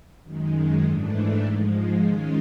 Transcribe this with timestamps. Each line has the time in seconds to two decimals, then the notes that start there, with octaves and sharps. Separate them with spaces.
0.23 F#2 D#3 G#3
0.83 G#2 E3 A3 D4
1.44 G#2 F3 G#3
2.04 D#3 G#3 C#4 F4